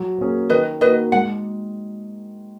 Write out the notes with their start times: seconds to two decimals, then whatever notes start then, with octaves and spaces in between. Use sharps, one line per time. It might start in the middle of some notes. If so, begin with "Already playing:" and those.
Already playing: F#3
0.18 A#3 C#4 G#4
0.50 D#3 B4 D#5
0.81 A#3 D#4 F#4 B4 D#5
1.12 G#3 F#5